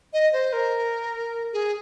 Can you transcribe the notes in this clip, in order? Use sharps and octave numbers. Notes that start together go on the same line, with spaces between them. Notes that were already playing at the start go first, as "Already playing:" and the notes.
D#5
C5
A#4
G#4